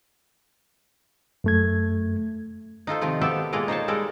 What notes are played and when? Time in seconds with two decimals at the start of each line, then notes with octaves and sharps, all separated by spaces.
1.44 F#2 A3 G#6
2.87 D#4 F4 A4 C5
3.01 C3 D#3 F3 F4
3.21 B3 G4 A4 E5
3.53 A#2 G#3 A#3 F4 A4 A#4
3.68 D#4 C5 C#5 A5
3.88 G3 G#3 A4 A#4